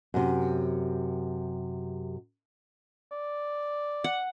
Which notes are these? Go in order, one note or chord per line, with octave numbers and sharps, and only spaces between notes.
F#2 C3
D5
F#5